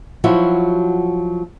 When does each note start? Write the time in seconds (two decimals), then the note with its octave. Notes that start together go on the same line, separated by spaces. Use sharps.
0.24 F3 F#3 E4 F#4